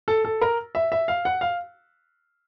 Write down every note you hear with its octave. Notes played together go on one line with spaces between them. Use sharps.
A4
A4
A#4
E5
E5
F5
F#5
F5